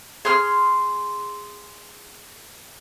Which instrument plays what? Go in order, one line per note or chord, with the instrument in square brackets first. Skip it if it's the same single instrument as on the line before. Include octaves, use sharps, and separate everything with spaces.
[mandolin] G#4 C6 F6